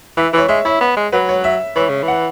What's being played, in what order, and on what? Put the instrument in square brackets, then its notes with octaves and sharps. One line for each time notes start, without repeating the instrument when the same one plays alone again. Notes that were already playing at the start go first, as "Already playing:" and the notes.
[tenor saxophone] E3 [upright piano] E5
[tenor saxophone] E3 [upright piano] C#5
[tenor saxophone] G#3 [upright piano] E5
[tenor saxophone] E4 [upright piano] C#5
[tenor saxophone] B3
G#3
[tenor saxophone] F#3 [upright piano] B4
[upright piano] C#5
E5
[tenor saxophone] E3 [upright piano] C#5
[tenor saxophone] C#3
E3
[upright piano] F#5